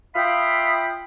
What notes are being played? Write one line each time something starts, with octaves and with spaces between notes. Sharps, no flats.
F4 E5 F5 G5 B5 D#6